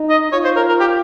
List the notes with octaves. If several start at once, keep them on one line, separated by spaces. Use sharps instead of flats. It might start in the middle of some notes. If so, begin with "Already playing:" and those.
Already playing: D#4
D#5
F4 C#5
C5
A#4
A#4
G4